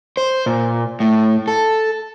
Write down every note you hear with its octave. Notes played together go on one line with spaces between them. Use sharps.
C5
A#2
A2
A4